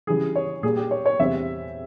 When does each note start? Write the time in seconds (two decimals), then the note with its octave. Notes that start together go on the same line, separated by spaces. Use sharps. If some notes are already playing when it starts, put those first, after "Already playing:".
0.07 C#3 E3 G3 G#4
0.36 C#5
0.63 A#2 G3 A#3 G#4
0.77 G4
0.91 C#5
1.06 C#5
1.19 E2 C3 G3 C4 E5